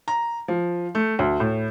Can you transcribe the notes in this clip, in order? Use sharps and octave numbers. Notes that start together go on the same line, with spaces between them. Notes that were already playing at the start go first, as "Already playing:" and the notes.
A#5
F3
A3
D2
A2